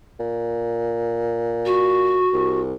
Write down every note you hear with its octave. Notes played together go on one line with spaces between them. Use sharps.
A#2
F#4
C2